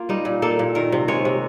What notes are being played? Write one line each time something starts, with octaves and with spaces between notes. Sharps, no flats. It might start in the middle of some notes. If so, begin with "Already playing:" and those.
Already playing: A#3 F4
G3 D#4
A#2
A#3 A4
A#2
D#3 A#4
C3
G#3 C#5
C3